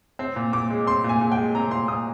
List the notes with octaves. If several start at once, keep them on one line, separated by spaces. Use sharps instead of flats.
C4
A#2
A#2 D6
G#3
C4 C6
A#2
G#5
A#2
G5
G#3
C4 A#5
A#2 C6
A#2 D#6